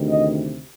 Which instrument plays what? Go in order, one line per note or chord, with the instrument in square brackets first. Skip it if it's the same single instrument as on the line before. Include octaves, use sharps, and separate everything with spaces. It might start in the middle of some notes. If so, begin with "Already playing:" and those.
Already playing: [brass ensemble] D2 C3 D#3
D#5